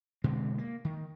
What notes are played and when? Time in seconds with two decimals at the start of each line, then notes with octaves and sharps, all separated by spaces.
0.24 B2 D3 G#3 C4
0.58 A#3
0.85 D#3